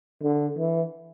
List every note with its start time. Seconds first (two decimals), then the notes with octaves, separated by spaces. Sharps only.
0.23 D3
0.58 E3